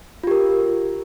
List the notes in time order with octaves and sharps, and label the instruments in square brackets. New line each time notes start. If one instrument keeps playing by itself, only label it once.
[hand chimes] F4
G4
A#4